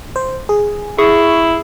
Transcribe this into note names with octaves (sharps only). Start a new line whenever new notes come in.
C5
G#4
E4 G#4 C#6